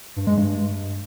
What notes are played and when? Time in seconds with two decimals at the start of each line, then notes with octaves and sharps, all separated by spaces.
0.16 G2
0.27 G#3
0.38 G2